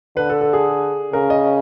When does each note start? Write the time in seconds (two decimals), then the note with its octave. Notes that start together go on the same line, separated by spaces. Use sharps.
0.17 D3 B4
0.30 A4
0.41 A4
0.53 G#4
1.13 C#3 A#4
1.30 D#5